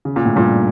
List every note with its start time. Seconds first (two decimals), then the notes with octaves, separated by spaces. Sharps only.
0.05 C#3
0.16 A#2
0.25 A2
0.36 G2 A#2